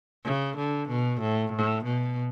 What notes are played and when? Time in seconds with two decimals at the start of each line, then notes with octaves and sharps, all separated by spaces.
0.25 C#3
0.57 D3
0.88 B2
1.20 A2
1.52 A2
1.84 B2